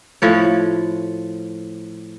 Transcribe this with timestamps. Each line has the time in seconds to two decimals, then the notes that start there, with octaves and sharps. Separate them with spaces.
0.22 A2 F3 C#5